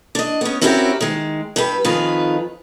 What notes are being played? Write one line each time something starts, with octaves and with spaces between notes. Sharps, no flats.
D4 D#5
B3 C#4
C4 C#4 E4 F#4 G4 A#4
D#3 G#3
G2 G4 B4
F2 D#3 F4 B4 G#5